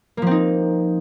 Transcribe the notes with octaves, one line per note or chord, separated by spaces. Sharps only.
F3 A#3 C4 D#4